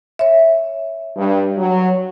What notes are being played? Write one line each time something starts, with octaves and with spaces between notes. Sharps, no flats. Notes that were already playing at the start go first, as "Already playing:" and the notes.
C#5 E5
G2
F#3